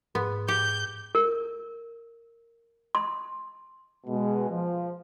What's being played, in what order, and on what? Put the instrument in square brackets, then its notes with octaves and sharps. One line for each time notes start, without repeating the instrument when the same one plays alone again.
[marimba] G#2 [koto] B3
[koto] G4 [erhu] G6
[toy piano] A#4
C6
[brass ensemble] B2 G#3
F3